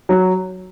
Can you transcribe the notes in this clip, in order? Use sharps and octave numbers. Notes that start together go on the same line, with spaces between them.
F#3